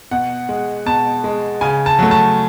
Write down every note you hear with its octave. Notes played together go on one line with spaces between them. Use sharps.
B2 F#5
G#3
B2 A5
G#3
C#3 G#5
A5
F#3 A3
A5